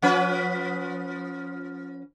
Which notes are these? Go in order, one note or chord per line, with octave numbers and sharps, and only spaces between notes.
F3 C#4 B4